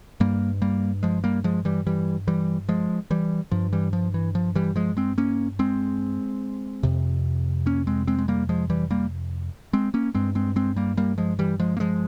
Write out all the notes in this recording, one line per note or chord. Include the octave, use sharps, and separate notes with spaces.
G2 G3 A#3
G3 A#3
F3 G#3
G3 A#3
F3 G#3
E3 G3
E3 G3
E3 G3
F3 G#3
E3 G3
G2 F3
E3 G3
F3
E3
F3
E3 G3
F3 G#3
G#3 C4
A#3 C#4
G#3 C4
F2 C3
A#3 C#4
G#3 C4
G#3 C4
G#3
G3 A#3
F3 G#3
E3 G3
G3 A#3
G#3 C4
A#3 C#4
G2 G#3 C4
G#3 C4
G#3 C4
G3 A#3
G3 A#3
F3 G#3
E3 G3
F3 G#3
A#3
F3 G#3